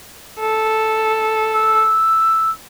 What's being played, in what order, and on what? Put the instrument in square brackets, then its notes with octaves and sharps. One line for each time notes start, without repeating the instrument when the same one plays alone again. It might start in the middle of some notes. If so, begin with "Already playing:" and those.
[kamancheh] A4
[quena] E6